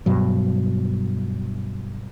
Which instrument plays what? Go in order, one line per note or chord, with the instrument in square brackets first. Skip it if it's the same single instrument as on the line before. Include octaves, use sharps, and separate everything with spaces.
[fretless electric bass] G2 B2 F#3